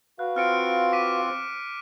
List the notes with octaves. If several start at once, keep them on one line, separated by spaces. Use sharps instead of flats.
F#4 B4 F5 F#6
C4 F4 F6 C#7 D7
D6 B6 D#7